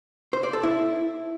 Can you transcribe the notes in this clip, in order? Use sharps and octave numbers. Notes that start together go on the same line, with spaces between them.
C5
D5
A4
E4